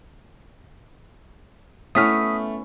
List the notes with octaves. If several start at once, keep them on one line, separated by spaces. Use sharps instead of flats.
A3 B3 C#4 E4 D#6 F6 B6